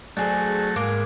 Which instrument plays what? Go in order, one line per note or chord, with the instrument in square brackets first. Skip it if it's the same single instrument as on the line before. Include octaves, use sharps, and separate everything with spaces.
[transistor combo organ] F#3 A3 [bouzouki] D4 G#4 C5
[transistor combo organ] G#2 D6 [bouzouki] A#3